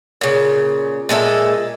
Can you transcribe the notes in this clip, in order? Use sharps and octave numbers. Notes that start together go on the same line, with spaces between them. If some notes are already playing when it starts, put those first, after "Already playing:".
A#2 C#3
A#2 G#3 A4 E5